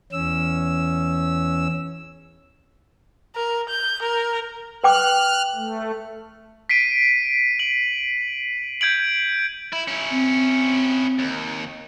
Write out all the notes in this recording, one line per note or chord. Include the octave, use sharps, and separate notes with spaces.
E2 C#4 E6
A#4
G6
A#4
B4 G5 D6 F6 F#6
A3
B6 C7 D7 D#7
F#7
G6 G#6 D7 F#7
E4
C#4 E4
C4
D#2